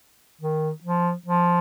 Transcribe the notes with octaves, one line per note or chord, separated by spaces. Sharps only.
D#3
F3
F3